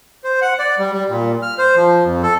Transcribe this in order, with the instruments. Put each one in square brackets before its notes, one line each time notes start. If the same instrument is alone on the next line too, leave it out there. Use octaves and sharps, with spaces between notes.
[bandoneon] C5
F#5
D5
G3
G3
A#2
F6
C5
F3
F2
A4